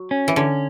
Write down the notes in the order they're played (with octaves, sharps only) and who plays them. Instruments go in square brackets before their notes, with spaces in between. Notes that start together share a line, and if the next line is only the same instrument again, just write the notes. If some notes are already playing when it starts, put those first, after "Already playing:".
Already playing: [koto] F#3
[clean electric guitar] C#4
[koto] E3
[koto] D3 [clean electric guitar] C#4